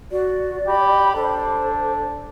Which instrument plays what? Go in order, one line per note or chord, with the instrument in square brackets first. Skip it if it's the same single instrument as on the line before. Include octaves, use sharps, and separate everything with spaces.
[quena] F#4 [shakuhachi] D5
[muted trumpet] G4 [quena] B5
[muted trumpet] D4 [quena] A4 [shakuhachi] C5